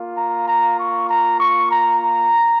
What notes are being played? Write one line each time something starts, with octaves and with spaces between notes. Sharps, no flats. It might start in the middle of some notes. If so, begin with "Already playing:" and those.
Already playing: A#3 F4
A#5
A#5
C#6
A#5
C#6
A#5
A#5